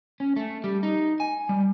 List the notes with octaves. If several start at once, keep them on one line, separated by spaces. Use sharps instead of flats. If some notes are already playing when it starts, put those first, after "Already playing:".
C#4
A3
G3
D#4
G#5
G3